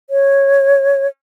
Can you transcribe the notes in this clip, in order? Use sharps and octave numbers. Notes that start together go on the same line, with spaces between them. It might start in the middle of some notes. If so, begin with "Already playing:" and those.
C#5